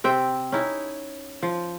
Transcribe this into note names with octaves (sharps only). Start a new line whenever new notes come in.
C3 C4 E5 G5
C#4 D#4 E4
F3